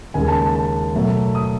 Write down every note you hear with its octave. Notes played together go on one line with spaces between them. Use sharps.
D#2 C#3 G#3 G#5
A5
A5
A5
B2 F#3 A3
D#6